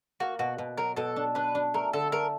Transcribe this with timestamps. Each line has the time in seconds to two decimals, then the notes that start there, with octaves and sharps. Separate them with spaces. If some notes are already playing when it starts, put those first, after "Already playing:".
0.20 A#3 F#4
0.39 B2 F#4
0.58 B2
0.77 F#3 A#4
0.96 B2 A4
1.16 D4
1.35 D4 B4
1.55 D4
1.74 A3 A#4
1.93 D3 A4
2.12 A3 A#4